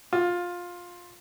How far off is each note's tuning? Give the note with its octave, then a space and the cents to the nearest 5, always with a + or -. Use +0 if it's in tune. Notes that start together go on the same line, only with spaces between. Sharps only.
F4 +15